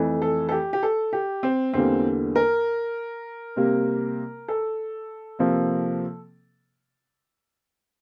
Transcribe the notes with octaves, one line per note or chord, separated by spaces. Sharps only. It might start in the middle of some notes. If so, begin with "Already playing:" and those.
Already playing: F2 E3 A3
A4
A4
G4
G4
A4
G4
C4
E2 D3 G3 A#3 C4
A#4
C3 G3 A#3
A4
C3 F3 A#3